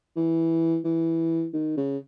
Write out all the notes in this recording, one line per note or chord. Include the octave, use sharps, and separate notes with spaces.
E3
E3
D#3
C#3